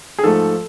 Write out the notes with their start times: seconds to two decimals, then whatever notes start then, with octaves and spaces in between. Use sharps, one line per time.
0.18 G#4
0.23 G#2 F3 A3 A4